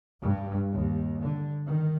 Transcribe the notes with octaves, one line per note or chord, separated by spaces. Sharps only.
G2
D#2
D3
D#3